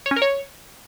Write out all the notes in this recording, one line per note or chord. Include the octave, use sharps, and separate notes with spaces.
C#5
C#4
A#4
C#5